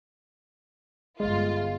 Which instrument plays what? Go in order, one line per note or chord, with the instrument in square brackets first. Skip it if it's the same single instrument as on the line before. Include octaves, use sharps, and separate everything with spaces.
[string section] G1 F4 [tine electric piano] G#3